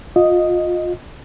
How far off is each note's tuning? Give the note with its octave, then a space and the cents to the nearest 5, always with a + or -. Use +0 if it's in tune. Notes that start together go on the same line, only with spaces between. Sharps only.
F4 +25 D#5 +0